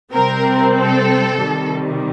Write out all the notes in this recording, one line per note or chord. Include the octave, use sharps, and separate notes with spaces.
C3 G3 C4 A#4
A4
C3 D#3 G3